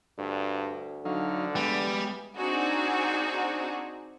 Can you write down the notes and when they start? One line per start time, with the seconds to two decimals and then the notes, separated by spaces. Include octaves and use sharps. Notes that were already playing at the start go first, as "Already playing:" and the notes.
0.18 D2 G2
1.05 D3 F#3 D#4 F5
1.55 E3 G3 G#3 B3
2.36 C4 D4 D#4 F#4 G#4